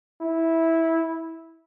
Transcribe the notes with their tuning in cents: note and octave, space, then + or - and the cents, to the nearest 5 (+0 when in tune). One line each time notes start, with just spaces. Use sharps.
E4 -10